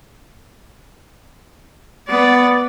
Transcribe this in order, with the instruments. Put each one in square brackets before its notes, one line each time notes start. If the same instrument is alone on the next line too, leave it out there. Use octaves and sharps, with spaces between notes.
[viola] B3 D5